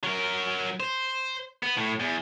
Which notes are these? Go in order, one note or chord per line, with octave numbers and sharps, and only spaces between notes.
F#3 A#4
C5
B3
A2
E2